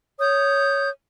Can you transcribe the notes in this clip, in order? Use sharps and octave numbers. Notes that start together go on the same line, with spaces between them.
C#5 D#6 G6